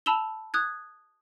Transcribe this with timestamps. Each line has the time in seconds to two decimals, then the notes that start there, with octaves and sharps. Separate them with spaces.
0.06 A5 B5 E6 E7 F7 G7
0.54 D#6 F#6 G#6